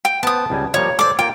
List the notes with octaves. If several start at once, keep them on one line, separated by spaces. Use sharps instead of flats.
G5
B3 B4 C5 A5 D#6
C#2 G3 G#5
F3 G3 A#3 C#5
A4 C5 D5 D6
A#3 F4 G5